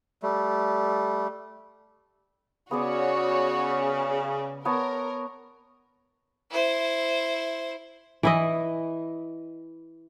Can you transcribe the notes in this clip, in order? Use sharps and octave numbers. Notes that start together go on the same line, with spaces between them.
G3 A3
C#3 B3 F#4 G#4 C#5 D5
B3 A#4 C#5 A5
E4 C5
E3 E4 D#5